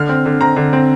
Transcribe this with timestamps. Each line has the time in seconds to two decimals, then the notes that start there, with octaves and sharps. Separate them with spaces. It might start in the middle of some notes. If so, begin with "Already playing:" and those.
Already playing: D3 F6
0.09 C4
0.26 D3
0.40 C4 A#5
0.56 D3
0.73 C4